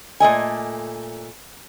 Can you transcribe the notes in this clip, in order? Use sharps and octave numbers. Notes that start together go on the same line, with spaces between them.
A#2 A3 D#5 G#5